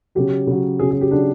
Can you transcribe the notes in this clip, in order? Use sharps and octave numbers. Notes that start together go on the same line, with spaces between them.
C#3 F#3 G4
C#3 F#3
C#3 F#3 G#4
G#4
G4
C#3 F#3 D4